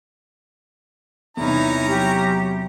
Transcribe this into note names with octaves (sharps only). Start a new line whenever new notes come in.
E2 C3 G3 C#4 D#4 E4 A#5
F#3 G4